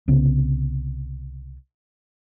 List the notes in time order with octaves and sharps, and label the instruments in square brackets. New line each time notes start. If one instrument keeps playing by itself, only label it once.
[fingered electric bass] C2 C#3 B3